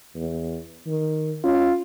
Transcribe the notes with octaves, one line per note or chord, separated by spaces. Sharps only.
E2
D#3
C#4 F4